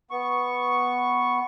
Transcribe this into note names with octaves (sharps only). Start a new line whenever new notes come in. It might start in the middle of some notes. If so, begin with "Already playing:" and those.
B3 C#6